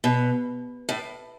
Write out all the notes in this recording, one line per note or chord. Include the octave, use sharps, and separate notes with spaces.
B2
A2